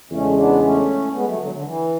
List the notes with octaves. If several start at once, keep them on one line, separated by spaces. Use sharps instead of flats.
E2 C#3 G#3 A3 C#4
B3 D4
A3 C#4
G#3 B3
F#3 A3
D3 F#3
D3
E3